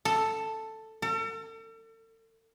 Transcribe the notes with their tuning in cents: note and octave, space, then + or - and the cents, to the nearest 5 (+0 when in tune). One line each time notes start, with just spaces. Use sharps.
A4 +5
A4 +40